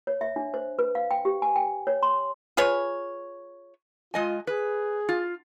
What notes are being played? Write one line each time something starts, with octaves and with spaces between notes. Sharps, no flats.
C#5
E5
D4
C5
B4
F5
G5
G4
G#5
G5
C#5
C6
F4 G#4 B4 C#5
G#3 F4 D#5 G#5
G#4 B4
F4